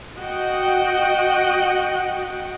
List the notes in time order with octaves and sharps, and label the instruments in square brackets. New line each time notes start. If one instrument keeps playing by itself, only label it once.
[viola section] F#4 D#5 F#5 G5